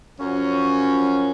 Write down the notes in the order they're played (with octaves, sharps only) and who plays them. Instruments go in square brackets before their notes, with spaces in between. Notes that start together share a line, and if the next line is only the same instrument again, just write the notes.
[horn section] F#2 F3 C#4